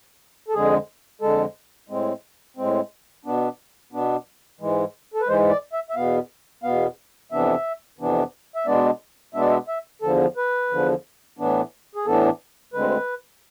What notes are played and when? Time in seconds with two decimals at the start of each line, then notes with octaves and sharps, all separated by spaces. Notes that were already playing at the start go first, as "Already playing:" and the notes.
0.48 A4
0.53 F2 D3 G#3 G#4
1.22 F2 D3 G#3 A4
1.89 A2 G#3 C4
2.57 A2 G#3 C4
3.25 B2 B3 D4
3.92 B2 B3 D4
4.60 G#2 E3 G#3
5.14 A4
5.21 B4
5.27 G#2 E3 G#3 C5
5.51 D5
5.73 E5
5.90 E5
5.95 E2 B2 B3 F5
6.63 E2 B2 B3 F5
7.31 F2 C3 E3 B3 D4 E5
7.99 F2 C3 E3 B3 D4
8.56 E5
8.67 B2 G#3 B3 D4 D5
9.34 B2 G#3 B3 D4 E5
9.41 D5
9.50 E5
9.68 E5
10.02 E2 D3 F3 A4
10.37 B4
10.70 E2 D3 F3
11.39 A2 E3 B3 D4
11.95 G#4
12.05 A2 E3 B3 D4 A4
12.73 D2 D3 G#3 C4 B4